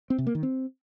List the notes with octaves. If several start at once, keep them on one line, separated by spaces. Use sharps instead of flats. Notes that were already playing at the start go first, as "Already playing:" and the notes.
C4
C3
A#3
D#3
C4